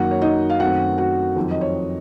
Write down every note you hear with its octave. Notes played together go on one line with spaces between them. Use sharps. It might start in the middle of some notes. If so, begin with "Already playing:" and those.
Already playing: F#2 D#3 A#3 F#4 F#5
C#5
D#4 D#5
F5
F#2 D#3 A3 C4 F#4 F#5
F#4 F#5
F2 D#3 F#3 C4
D#5
C#5